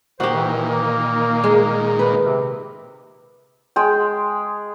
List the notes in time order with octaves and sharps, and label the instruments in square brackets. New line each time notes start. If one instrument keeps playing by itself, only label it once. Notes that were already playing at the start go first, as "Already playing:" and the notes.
[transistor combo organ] A#2 D#3 [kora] F#4 G4 [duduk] C5
[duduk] E3
A#3
[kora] G#3
B4
[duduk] C3
[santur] G#3 G5